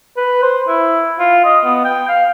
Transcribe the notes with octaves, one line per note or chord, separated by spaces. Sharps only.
B4
C5
E4
F4
D#5
B3
G5
F5